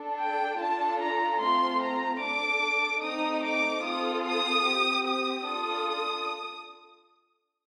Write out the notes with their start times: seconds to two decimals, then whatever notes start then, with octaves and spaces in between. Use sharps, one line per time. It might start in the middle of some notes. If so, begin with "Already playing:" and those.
Already playing: D4 A4
0.22 G5
0.62 D4 F4 A4 A5
1.03 A#5
1.43 A3 C4 F4 C6
1.84 A#5
2.23 D4 A4 D6
3.05 A3 C4 D#4 D#6
3.46 D6
3.86 C4 F4 A4 D#6
4.27 D#6
4.67 C4 G4
5.07 D#6
5.48 D4 F4 A4 D#6